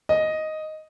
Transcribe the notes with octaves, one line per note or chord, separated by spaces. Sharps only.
D#5